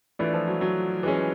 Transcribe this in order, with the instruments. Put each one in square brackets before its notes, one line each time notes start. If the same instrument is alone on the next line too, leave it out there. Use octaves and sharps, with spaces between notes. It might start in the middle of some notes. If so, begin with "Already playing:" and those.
[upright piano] E3 [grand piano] A3 D4 F4
[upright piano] F3
F#3
F#3
[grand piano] E3 G#3 C#4